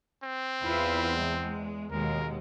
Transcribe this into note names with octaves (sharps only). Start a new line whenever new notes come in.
C4
E2 E4 F4 B4
G#3
D#2 B2 G#3 A#4